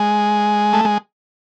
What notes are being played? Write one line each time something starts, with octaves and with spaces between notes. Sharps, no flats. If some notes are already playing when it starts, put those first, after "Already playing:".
Already playing: G#3
A3
G#3